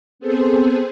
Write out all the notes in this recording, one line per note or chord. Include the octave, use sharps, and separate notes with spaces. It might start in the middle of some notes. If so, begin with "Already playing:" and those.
B3 C4 G#4 A4 C5